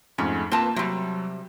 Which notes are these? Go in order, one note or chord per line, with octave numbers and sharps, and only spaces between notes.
F2 G#2 A3 C#4
A#3 C4 F4 B4 A5
C3 F#3 G3